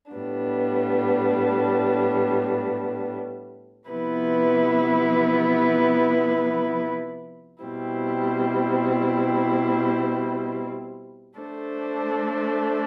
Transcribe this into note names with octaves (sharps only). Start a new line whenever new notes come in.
A2 G3 B3 D4
C3 F3 B3 E4 B4
B2 G3 C4 E4
A3 D4 A4 C5